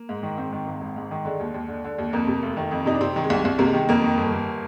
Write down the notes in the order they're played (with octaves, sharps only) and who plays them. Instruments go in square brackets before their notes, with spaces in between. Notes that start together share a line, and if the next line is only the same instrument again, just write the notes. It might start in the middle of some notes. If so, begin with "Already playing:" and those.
Already playing: [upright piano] A#3
G#2
D#3
G#2 C4
D#3
G#1
G#1
G#2
D#3
D3 G#3
D#2
D#2
D3
D3
D#2
F2 A#3
C3
F1
D#3
F2
C3 D#4
D4
C3 C4
D#3
G#3
C2
C2
C3 A#3
G#3
D#3
F2 A#3
D#3
G1
G1